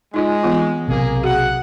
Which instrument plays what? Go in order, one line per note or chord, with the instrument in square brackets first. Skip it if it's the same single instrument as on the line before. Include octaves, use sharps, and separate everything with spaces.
[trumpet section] G#3 [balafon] D#4 F4 D#5
[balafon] E3 B3 F4
[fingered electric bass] B1 C3 [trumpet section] A#3 G#4
[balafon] F#4 G#4 [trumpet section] F#5